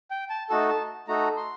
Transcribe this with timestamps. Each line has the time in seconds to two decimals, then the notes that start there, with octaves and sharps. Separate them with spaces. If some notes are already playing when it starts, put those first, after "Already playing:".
0.11 G5
0.30 A5
0.50 A3 D#4 F#4 A4 A5
0.69 A5
1.08 A3 D#4 F#4 A4 A#5
1.37 C6